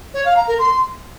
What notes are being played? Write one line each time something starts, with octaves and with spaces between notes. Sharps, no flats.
C#5
F5
A#5
A#4
C6